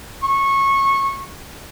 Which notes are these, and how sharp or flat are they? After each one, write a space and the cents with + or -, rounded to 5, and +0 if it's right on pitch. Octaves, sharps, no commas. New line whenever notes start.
C#6 -20